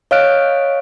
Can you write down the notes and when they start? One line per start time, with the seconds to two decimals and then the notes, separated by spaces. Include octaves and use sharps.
0.11 C#5 D#5 F5 F6 F#6 D7